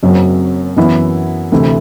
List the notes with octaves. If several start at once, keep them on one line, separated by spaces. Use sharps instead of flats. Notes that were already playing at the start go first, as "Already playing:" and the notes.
F#1 F#2 F#3 C4
F#2 E3 B3 E4
D2 C3 E3 A3 E4